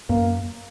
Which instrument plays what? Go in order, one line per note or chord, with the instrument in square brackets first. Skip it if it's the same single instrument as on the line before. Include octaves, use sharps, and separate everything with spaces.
[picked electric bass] F#2 [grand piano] A#3